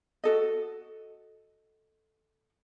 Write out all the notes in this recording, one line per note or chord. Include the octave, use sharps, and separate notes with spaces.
F#4 A4 D#5